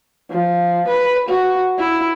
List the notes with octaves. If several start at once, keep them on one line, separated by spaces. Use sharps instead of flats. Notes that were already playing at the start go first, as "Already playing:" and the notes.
F3
B4
F#4
E4